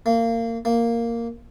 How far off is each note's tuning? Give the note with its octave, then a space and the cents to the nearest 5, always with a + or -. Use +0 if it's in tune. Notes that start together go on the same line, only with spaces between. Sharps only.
A#3 -25
A#3 -5